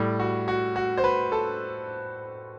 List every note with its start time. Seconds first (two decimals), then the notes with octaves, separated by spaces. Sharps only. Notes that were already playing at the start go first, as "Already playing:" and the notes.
Already playing: A2 G3
0.19 F#4
0.48 F#4
0.76 F#4
0.98 C5
1.04 B4
1.32 A4